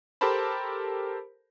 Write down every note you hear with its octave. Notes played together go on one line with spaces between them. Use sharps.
G4 A4 A#4 C5 A5 B5